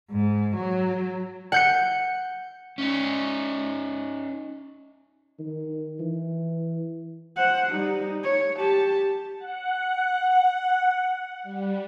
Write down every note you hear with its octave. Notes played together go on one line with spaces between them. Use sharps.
G#2
F#3
F#5 G6 C#7
C#4 D#4
D#3
E3
C5 F#5
G3 D#4
C#5
G4 A5
F#5
G3